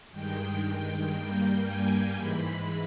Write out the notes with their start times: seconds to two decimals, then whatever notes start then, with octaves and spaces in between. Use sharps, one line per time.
0.12 G2 D#3 G#3 G5
0.63 G5
1.13 G2 G3 A#3
1.64 G#5
2.15 G#2 E3 G#3 B5